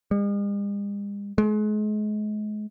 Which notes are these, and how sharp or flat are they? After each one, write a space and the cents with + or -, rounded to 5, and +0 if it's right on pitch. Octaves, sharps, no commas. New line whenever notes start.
G#3 -45
G#3 +35